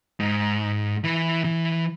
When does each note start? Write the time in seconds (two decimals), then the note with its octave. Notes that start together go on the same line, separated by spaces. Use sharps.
0.20 G#2
1.04 E3
1.45 E3